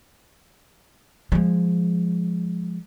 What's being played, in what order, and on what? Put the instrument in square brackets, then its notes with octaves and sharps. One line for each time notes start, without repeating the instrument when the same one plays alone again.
[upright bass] F3 G#3